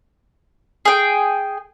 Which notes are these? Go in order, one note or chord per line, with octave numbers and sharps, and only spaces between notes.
G#4 G5